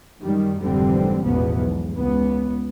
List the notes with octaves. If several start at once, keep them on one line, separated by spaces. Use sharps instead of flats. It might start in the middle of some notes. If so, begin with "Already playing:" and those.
F#2 D#3 G3
F1 G#2 D3 E3 G3 C4
A1 E2 G#2 B2 F3 B3
B1 G#2
C#2 B3